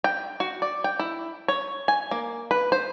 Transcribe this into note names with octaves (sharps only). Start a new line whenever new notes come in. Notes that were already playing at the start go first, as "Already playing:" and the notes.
G5
F#4
D5
G5
E4
C#5
G#5
A#3
B4
C5